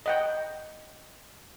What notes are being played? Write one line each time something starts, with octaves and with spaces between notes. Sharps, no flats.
D#5 F#5 G5